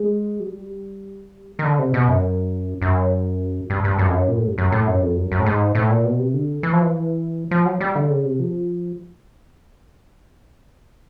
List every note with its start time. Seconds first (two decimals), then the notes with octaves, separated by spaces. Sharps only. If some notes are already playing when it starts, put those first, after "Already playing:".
Already playing: G#3
0.40 F#3
0.46 G3
1.59 D#3
1.64 D3
1.79 C3
1.94 B2
2.08 F#2
2.82 F#2
3.70 G2
3.84 G2
3.99 F#2
4.08 F2
4.13 F#2
4.28 A#2
4.38 A2
4.47 G2
4.58 F#2
4.72 A2
4.87 F#2
5.01 F2
5.16 F#2
5.32 F#2
5.40 A2
5.46 G#2
5.75 A2
5.90 A#2
6.05 B2
6.19 C3
6.34 D3
6.63 E3
6.73 F3
6.82 E3
7.51 F3
7.65 F#3
7.80 G3
7.95 D3
8.10 C#3
8.25 C3
8.40 F3